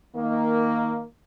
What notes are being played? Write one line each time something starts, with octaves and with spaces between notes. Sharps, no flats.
D#3 A#3